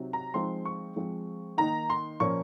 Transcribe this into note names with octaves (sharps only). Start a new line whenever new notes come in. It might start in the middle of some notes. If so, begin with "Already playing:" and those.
Already playing: C3 F#3 C4 D#4
A#5
F3 G#3 C4 D#4 C6
C#6
F3 G#3 C4
D#3 A#3 D#4 A#5
C6
A#2 F3 A#3 C#4 C#6